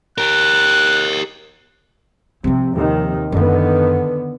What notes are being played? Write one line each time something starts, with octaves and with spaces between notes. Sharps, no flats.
G4 A#4 F#6
C3 F3 C4
D#2 C3 D#3
F#2 D3 D#3 B3 D#4